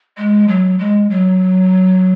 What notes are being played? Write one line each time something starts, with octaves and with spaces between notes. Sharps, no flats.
G#3
F#3
G#3
F#3